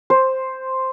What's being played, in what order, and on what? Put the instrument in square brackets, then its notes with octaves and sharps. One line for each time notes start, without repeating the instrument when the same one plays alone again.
[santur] C5